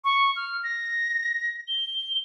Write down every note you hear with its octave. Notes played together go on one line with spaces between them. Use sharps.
C#6
F6
A#6
G7